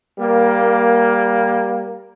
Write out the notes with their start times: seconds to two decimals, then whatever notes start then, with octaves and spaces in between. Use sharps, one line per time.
0.18 G3 A#3